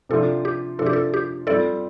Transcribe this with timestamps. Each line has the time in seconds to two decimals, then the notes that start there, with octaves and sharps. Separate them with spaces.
0.09 C3 F3 D4 F4 A4
0.45 G4
0.79 C3 F3 D4 F4 A4
0.86 G4
0.93 A4
1.14 G4
1.47 G3 C4 F4 A4 D5